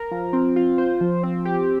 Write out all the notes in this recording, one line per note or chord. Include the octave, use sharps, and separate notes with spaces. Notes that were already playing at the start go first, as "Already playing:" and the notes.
Already playing: A#4
F3
C4
F4
C5
F3
C4
G4